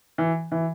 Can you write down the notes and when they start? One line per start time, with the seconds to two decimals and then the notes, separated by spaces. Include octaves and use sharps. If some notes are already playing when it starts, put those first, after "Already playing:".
0.18 E3
0.52 E3